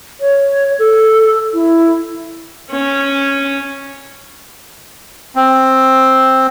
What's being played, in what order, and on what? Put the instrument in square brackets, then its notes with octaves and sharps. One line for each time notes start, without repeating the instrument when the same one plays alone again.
[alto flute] C#5
A4
E4
[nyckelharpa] C#4
[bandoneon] C4